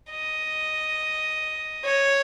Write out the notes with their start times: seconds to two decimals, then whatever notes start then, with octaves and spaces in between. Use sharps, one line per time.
0.11 D#5
1.85 C#5